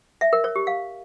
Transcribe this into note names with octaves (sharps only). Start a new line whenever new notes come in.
E5
A#4
C#5
G4
F5